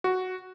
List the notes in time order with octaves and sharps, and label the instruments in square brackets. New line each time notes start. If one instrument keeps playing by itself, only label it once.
[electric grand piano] F#4